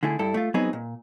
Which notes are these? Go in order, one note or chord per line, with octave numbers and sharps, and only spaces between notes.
D3 A3 E4 G#4
G2 E4 A4
A3 F4
F#3 B3 C4 D#4 G#4 B4
A#2